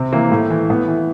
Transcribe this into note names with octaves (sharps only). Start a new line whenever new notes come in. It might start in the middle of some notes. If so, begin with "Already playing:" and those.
Already playing: C3 C4
E3 A#3
A2 A3
E3
A2 B3
E3